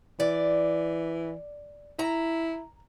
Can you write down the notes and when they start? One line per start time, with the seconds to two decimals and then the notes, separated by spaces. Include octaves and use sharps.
0.20 E3 D5
1.99 E4 A#5